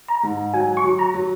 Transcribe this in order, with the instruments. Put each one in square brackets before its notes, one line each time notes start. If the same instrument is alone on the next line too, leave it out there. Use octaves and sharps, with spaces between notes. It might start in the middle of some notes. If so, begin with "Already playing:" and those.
[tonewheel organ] A#5
[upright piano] G#2
[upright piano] F#3 [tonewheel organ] G#5
[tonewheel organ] C#6
[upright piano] F#3
[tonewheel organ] A#5
[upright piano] F#3